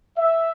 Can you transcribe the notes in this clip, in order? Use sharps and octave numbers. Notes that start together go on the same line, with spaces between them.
E5